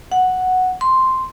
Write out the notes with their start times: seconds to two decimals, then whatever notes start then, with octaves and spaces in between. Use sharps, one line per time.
0.12 F#5
0.81 C6